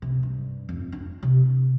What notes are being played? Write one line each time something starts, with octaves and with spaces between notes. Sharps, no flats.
C3
G2
F2
D4
C3